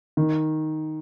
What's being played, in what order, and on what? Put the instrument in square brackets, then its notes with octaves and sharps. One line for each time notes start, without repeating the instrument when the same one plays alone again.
[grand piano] D#3